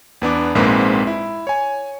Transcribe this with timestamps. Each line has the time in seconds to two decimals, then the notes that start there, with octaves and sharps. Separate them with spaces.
0.22 E2 B3 D4 D6
0.55 A#1 G#2 G#3 A#3 C4 B4
1.07 E4
1.47 C#5 G#5